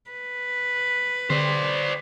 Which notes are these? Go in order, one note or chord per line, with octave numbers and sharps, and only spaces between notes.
B4
D3 C5 D5